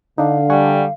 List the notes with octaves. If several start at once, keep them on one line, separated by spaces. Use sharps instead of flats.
D3 D4 D#4 F5
G3 F#5 G#5 C#6